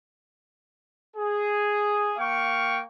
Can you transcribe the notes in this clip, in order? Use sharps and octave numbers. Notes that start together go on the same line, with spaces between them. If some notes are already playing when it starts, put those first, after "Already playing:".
G#4
A#3 F5 G5 C#6